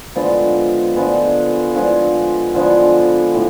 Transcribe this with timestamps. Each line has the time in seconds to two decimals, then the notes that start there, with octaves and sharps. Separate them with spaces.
0.15 D3 F3 G#3 B3
0.96 D3 F3 G#3 B3
1.75 D3 F3 G#3 B3
2.55 D3 F3 G#3 B3
3.35 A2